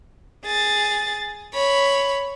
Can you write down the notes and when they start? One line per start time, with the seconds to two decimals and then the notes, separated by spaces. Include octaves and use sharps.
0.45 G#4 A6
1.54 C#5 B5